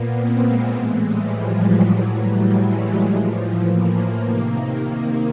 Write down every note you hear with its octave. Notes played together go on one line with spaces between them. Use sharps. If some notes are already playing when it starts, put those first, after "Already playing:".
Already playing: A#2 A#3 B3
C4
G#3
A2 E3 G#3
G3
F3
F#3
A2 E3
G3
G#3
F#3
A2 E3 F3
A#3
A#3
C3 D#3